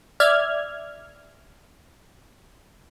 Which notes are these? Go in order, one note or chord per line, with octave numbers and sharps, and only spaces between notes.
D5 E5 F6 G#6